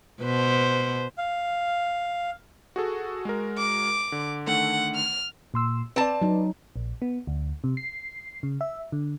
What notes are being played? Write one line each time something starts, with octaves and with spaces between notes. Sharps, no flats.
B2 B4 C5
F5
F#4 G#4 A4
G#3 F#4 A#4
D6
D3
D3 D#3 A3 F#5
F6
A#2 C6 E6
C4 B4 D5 A5
F#3 D#4
A#1
B3
D2
C3
C7
C#3
E5
D3